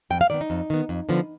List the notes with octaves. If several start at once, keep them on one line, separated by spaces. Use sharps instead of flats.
F2 G5
F5
D#3 B3 D5
D#4
F2
D#3 B3
F2
D3 F3 B3